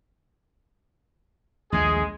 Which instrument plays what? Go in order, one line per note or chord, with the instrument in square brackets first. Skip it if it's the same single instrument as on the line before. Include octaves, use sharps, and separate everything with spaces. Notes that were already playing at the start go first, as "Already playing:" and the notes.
[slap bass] A#1 D#2 A3 [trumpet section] G#3 G#4